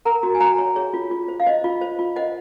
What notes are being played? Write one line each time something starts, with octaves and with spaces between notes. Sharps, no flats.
A#4 F#5 A#5
F#4
G#5
F#4 F#5 A#5
C#5
G#4 C#5
F4
F4
C5
F5
C5 D#5
F4
C5
F4
C5 D#5 F#5